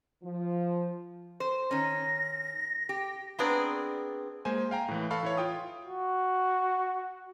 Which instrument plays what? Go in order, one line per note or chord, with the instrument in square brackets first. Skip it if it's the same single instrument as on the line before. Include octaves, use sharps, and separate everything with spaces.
[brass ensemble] F3
[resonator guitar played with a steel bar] C5
[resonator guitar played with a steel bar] D#3 C#4 [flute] A#6
[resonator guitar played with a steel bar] G4
[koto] B3 C4 D4 G#4 A#4 D5
[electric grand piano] G#3 A#3 C5 G#5
F5 G5 A#5
A2 E3
A4 F5 B5 C#6
E3 E4 C#5
F4 G5 D#6
[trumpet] F#4